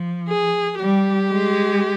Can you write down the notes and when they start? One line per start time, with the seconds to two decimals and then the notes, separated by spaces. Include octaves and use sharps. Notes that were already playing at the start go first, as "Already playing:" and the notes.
Already playing: F3
0.28 G#4
0.80 G3 G4
1.31 G#3